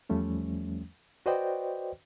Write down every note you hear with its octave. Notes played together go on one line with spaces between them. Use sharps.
E2 F3 G3 A3 C#4
F#4 B4 C5 D5 D#5 G5